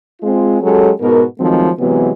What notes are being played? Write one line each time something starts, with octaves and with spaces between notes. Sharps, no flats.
G#3 C4 F4
F#3 G#3 C#4 G4 A4
G#2 B2 B3 F#4 A#4
D#3 F3 F#3 G#3 A3 C4
C3 E3 F#3 G#3 B3